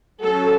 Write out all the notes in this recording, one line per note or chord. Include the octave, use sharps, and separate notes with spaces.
F#3 C#4 A4